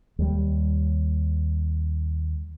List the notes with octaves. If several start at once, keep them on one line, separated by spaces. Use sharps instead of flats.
D#2 G3